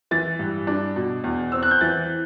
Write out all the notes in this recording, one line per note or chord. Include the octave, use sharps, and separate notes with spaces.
E3 A6
G2
D4
B2
E2
C4 E6
F#6
G6
E3 A6